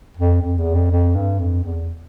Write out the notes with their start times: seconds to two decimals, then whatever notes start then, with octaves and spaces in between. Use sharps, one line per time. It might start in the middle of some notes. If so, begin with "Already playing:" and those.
0.17 F2
0.42 F2
0.58 E2
0.74 F2
0.90 F2
1.15 G2
1.39 F2
1.64 E2